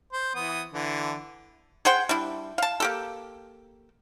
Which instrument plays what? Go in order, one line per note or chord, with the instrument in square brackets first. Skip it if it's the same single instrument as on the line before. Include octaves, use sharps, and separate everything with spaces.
[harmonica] C5
E3 B3 D#6
D3 E3
[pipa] G#4 C5 F#5 G5
G3 D4 E4
F5 A5
A#3 G4 A4